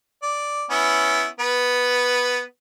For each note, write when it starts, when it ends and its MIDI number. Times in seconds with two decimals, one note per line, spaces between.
0.22 0.64 74
0.70 1.26 59
0.70 1.26 61
0.70 1.26 64
1.40 2.42 59
1.40 2.42 71